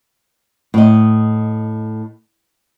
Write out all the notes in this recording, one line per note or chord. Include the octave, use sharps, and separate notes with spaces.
A2 D#5